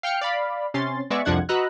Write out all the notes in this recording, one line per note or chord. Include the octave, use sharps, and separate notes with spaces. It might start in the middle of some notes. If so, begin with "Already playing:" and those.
F5 G5 F6 C#7
D5 F5 B5
C3 C#4 C6 A6
G#3 B3 D5 E5 C#6
C2 F2 F3 D4 F#5 G#6
F#4 B4 D#5 A#5 E6 F#6